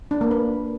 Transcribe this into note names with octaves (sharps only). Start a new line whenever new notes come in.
D4
A#3
B4